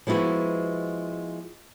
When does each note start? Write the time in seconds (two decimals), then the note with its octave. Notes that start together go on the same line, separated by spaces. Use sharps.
0.07 F3 G#3 B3 E4 F#4